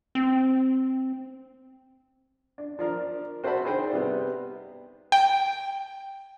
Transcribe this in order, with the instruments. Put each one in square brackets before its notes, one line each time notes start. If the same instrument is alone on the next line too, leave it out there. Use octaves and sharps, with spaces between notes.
[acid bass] C4
[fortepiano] D4
F3 D4 A#4
F#4 C5 D5 E5 A5 B5
D4 D#4 G#4 C5 D5 G5
C3 G3 B3
[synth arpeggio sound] G5